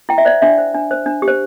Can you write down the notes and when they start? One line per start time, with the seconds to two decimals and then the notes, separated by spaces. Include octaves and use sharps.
0.09 E4 G5
0.18 E5
0.25 C5 D5
0.42 D4 E5
0.58 C5
0.75 D4
0.91 C5
1.06 D4
1.22 G4
1.28 C5